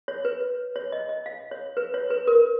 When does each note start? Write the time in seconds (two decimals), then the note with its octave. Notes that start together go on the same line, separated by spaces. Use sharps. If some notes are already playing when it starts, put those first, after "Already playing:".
0.08 C#5
0.25 B4
0.76 C#5
0.92 D#5
1.09 D#5
1.26 F5
1.51 C#5
1.77 B4
1.94 C#5
2.10 B4
2.27 A#4